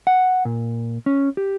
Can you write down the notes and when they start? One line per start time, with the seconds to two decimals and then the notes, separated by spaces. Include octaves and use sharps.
0.07 F#5
0.45 A#2
1.06 C#4
1.37 G4